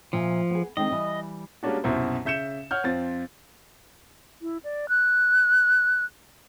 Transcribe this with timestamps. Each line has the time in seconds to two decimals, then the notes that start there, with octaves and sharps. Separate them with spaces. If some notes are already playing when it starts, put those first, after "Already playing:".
0.13 A#2 F3 E5 G#5
0.51 B3 G#4
0.77 D#3 G#3 C4 D#5
0.91 E3 G3
1.63 G3 G#3 A#3 C#4 D4 F#4
1.84 C2 F#2 B2 E4 C5
2.25 C#3 E5 G6 C#7 E7
2.71 C#5 F#5 F6 G6
2.84 F2 C4 F4 A6
4.42 E4
4.64 D5
4.89 F#6